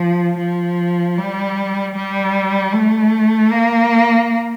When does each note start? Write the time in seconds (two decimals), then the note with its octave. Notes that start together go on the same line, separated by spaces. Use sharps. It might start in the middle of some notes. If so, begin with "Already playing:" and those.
Already playing: F3
0.39 F3
1.17 G3
1.95 G3
2.73 A3
3.52 A#3